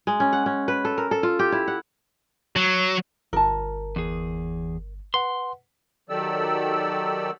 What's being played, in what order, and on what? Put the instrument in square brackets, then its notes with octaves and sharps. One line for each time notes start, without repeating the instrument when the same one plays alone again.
[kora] G#3
C#4
F#5
C#4
B4
A4
A#4
A4
F4
G4
E4
F#5
[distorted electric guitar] F#3
[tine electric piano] G1 [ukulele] A#4 A5
[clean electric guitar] E2 G#4
[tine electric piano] B4 F#5 [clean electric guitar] C6
[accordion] D#3 F#3 G4 A4 D5 E6